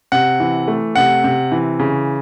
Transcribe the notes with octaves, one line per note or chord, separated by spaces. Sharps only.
C3 F#5
E3
A3
C3 F#5
C3
E3
C#3